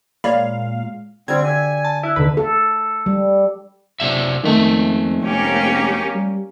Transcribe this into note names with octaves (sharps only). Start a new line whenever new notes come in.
A#2 G#3 C#5 D5 F5 B5
D3 G3 C4 G4 G#6
D5 G#5 E6 B6
A5
E4 E6 F#6
D#2 D3 B4 E7
A4
G3
F#1 C3 D4 E5
F2 D#3 G#3 A3 E5
F1 A#3 C#4 G4
G3